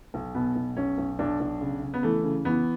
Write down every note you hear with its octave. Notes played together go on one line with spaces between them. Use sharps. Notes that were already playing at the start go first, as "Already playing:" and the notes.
B1
B2 B3
B1
B1 C#4
B1
B1 D4
B1
C#3
C#3
B3
E3 A3
C#3
E3 B3